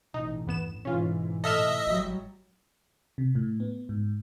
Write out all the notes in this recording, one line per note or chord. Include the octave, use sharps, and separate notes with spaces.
A1 B2 D#4
E2 G2 B3 E7
G#2 B2 E3 C#4 F4
A2 A4 D#5 E5 F6 E7
G#1 F#3 G3
C3
A2
B3
G#2